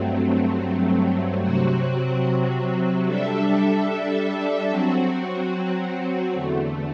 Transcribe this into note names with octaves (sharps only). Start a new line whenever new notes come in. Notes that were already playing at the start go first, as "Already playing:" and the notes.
Already playing: G2 F#3 A3 C4
C3 F#3 C4 F#4
G3 D4 A4 E5
F#3 C4 F#4
E2 D3 A3